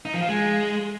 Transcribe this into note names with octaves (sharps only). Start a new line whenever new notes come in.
D#4
F3
F4
G#3